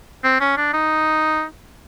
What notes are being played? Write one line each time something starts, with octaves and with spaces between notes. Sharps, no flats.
C4
C#4
D4
D#4